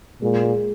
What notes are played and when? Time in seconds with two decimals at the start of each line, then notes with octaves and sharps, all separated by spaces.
0.22 A#2 G#3
0.44 G#3